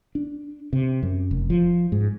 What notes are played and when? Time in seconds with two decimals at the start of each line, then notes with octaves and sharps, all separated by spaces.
0.15 D4
0.73 C3
1.03 F#2
1.31 F1
1.50 F3
1.92 G#2